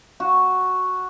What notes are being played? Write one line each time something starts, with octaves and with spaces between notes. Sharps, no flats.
F#4